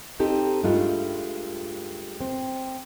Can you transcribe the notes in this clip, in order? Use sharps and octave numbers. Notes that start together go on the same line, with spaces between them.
C4 D#4 G4 A4
G2 G#3 A3 F4
C4